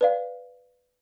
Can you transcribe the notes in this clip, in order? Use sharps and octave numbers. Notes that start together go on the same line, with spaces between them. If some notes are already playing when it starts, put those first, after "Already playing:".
B4 D5 F5